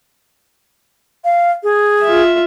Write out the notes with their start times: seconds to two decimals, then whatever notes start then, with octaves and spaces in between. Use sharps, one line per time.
1.24 F5
1.63 G#4
2.03 F4 E5